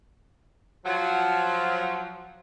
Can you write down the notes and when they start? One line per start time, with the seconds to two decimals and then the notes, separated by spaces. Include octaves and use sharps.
0.85 F3 F#3